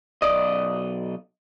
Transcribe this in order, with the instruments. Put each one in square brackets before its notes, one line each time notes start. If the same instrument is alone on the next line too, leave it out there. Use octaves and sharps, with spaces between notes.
[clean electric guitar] B1 F2 D5 D#5